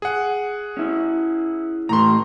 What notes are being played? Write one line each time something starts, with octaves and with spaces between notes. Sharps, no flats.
G#4 F#5
C#4 E4
A2 E3 A3 A#5 C6